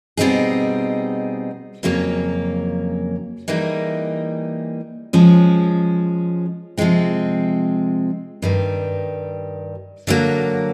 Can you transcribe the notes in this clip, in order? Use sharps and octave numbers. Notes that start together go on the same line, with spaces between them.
B2 G3 C4 D#4 G#4
F2 C#3 F#3 A#3 C#4
E3 G3 A#3 D#4 G#4
F3 G#3 C#4
C3 F3 G#3 C4
G2 D#3 G3
D3 F#3 A#3